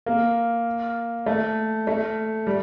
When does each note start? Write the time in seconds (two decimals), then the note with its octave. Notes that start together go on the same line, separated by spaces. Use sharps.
0.06 A#3
1.26 A3
1.87 A3
2.47 G3